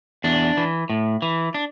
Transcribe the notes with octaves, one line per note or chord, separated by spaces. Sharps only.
E2 D4
E3
A2
E3
D4